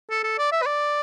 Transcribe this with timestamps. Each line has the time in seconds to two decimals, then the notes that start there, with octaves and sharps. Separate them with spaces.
0.10 A4
0.24 A4
0.38 D5
0.52 E5
0.62 B4
0.66 D5